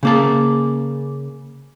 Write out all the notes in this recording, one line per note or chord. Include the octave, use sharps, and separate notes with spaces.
C#3 A#3 A5